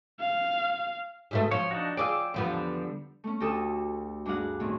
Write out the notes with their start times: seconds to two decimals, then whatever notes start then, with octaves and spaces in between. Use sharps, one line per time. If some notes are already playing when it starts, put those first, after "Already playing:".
0.20 F5
1.31 G#2 B2 A3
1.51 F3 C#5
1.71 D4 D#4 F#4
1.97 F4 G#4 D5 G5 D6 E6
2.34 E2 D3 F3 G3 B3
3.24 A3 C#4
3.40 D2 F#4 G4 A4 D#6 E6
4.25 G2 D4 F#4 G#4 F5 F#5
4.60 A2 D#3 C4